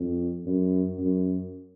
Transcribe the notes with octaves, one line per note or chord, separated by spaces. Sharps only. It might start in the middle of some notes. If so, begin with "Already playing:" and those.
Already playing: F2
F#2
F#2